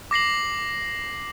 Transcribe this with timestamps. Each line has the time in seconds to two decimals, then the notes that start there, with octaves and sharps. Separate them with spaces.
0.11 D6 A#6 C7 F#7